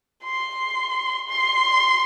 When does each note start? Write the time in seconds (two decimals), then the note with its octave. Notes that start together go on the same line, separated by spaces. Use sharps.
0.24 C6
1.30 C6